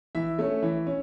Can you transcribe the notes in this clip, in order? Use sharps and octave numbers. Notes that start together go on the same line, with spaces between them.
E3 E5
A3 C#4
E3
C#4